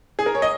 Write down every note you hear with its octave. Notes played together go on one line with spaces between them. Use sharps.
G#4
A#4
C#5
D#5